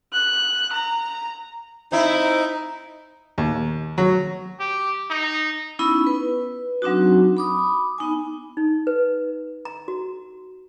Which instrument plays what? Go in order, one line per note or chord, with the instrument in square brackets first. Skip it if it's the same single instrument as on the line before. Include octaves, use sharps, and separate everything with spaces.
[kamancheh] F#6
A#5
[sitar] C4 E4 [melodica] D#4
[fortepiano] D#2
F#3
[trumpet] G4
D#4
[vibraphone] B3 C#4 D#4 E4 B5
B4
F#3 C4 D4 D#4 F#4
B5 D6 D#6
B3 D#4 G#5
[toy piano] D#4
B4
A#5
F#4